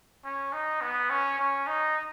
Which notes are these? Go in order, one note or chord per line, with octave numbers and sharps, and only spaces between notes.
C#4
D#4
B3
C#4
C#4
D#4